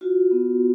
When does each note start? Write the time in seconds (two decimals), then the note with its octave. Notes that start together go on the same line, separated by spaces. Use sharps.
0.01 F4 F#4
0.31 B3